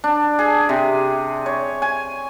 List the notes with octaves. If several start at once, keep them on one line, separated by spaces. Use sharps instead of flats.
D4
G#4
C3
C#5
G#5